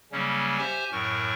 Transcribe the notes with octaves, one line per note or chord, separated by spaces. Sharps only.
C#3 F#3 G3 A#3 C#4
G4 C5 E5 G#5
F#2 A2 F#3 A#4 C#6